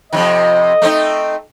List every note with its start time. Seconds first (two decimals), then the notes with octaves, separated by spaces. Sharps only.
0.13 F2 C3 D#3 D#5
0.82 A3 C4 D#4